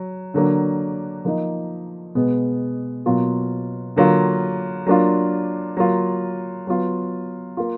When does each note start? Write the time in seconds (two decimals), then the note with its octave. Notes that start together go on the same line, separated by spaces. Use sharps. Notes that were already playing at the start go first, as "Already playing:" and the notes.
Already playing: F#3
0.34 D3 F#3 A#3 D4
1.25 F3 A#3 D#4
2.15 B2 G#3 B3
3.06 B2 F#3 A#3 F4
3.96 D3 F#3 A#3 F4
4.87 F#3 A#3 D4 F4
5.77 F#3 A#3 F4
6.67 F#3 B3 F4
7.57 A#3 F4